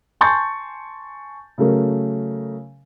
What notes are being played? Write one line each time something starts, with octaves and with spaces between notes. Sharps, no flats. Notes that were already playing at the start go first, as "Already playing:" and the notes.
G#5 A5 C6 C#6 G6 A6
C#3 F#3 A3 A#4